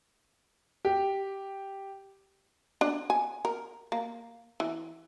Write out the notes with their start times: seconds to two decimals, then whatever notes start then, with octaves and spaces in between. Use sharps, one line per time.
0.85 G4
2.81 D4
3.10 G#5
3.45 A#4
3.92 A#3
4.60 E3